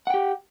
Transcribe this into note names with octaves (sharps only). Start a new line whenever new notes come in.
G4 F#5 G5